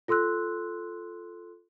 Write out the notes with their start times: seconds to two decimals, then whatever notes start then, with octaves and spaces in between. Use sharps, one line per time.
0.08 F4 A4 C6 E6 F#6